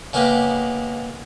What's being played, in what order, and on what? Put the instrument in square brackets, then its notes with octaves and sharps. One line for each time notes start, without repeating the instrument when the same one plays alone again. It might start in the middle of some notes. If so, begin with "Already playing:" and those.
[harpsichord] C#3 G#3 A#3 B3 G4